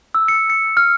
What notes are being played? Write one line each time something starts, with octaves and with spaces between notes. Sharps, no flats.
E6
C#7
C#7
F6